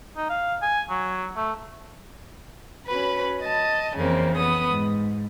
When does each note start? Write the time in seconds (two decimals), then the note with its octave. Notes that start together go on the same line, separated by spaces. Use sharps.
0.17 D#4
0.30 F5
0.62 G#5
0.90 F#3
1.36 A3
2.86 C#4 F#4 B4 B5
3.41 D#5 A5
3.95 F2 C#3 E3 A#3 C4
4.37 B3 D#6
4.69 G#2